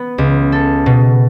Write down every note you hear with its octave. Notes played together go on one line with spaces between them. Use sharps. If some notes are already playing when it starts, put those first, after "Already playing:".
Already playing: B3
C#2
A4
B2